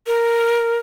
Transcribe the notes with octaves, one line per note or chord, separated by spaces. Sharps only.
A#4